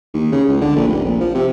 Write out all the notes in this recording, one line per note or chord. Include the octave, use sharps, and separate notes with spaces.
D#2
C#3
C#2
D3
A#1
F1
A#1
F3
C3